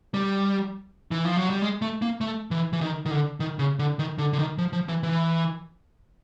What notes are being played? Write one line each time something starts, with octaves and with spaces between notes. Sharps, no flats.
G3
E3
F3
F#3
G3
G#3
A3
A#3
A3
E3
E3
D#3
D#3
D3
D#3
C#3
D3
D#3
D3
D3
D#3
F3
F3
E3
E3